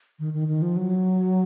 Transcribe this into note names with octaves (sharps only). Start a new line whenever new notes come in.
D#3
D#3
D#3
F3
F#3